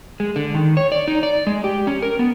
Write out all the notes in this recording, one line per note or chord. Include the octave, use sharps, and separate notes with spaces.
G#3
D3
D#3
C#5
D5
D#4
D5
G#3
G4
C#4
A#4
B3